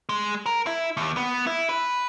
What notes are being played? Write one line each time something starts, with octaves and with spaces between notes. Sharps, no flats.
G#3
A#4
E4
D#2
B3
E4
B4